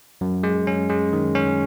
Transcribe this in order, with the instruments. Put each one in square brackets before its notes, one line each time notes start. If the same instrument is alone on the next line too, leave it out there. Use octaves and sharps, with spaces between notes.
[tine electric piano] F#2
G#3
C#4
G#3
D#3
C#4